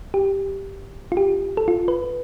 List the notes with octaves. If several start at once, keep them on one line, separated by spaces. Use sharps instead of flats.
G4
F4
G4
A4
F4
B4